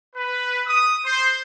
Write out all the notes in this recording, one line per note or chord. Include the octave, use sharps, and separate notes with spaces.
B4
D#6
C5